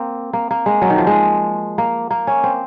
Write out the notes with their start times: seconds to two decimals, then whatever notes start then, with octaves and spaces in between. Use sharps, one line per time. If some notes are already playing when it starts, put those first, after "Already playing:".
Already playing: A#3 C4
0.33 A#3
0.51 A#3
0.66 G#3
0.82 F#3
0.90 D#3
0.98 F3
1.07 G#3
1.78 A#3
2.11 A#3
2.27 C#4
2.44 C4